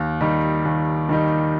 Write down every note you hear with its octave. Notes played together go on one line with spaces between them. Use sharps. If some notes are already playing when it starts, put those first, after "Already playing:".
Already playing: D#2
D#3 G3 D#4
D#2
D#3 G3 D#4